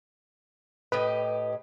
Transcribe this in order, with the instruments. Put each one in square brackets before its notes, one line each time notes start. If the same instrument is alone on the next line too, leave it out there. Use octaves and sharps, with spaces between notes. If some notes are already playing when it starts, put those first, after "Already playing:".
[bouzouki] A2 G4 D#5 [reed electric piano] B4